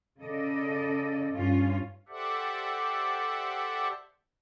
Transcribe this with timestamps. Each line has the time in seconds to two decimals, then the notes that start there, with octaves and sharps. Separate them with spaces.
0.21 C#3 A4 D5 D#5
1.34 G2 C#4 F4
2.09 G4 A4 C5 D5 E5 F#5